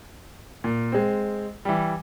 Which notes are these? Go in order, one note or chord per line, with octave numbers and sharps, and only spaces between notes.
A#2
G#3 C4
E3 G3